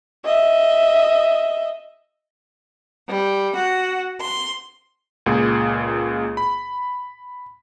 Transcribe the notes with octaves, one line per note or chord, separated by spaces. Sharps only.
D#5 E5
G3
F#4
C6
C#2 A#2 G#4
B5